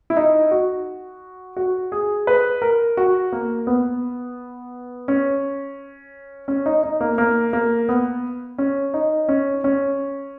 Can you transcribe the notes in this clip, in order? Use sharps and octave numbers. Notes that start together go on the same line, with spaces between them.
E4
D#4
F#4
F#4
G#4
B4
A#4
F#4
A#3
B3
C#4
C#4
D#4
D#4
A#3
A#3
A#3
B3
C#4
D#4
C#4
C#4